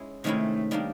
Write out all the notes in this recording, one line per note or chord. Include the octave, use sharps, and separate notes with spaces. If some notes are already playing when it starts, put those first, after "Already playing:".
Already playing: G#3 C#4 E4
C3 D#3 G#3 A3 C#4 E4
D#3 G3 A#3 D4